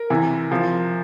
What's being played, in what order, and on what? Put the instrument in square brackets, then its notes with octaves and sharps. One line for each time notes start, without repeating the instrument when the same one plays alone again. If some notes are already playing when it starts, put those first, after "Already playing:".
Already playing: [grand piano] A#4
C3 E3
C3 F3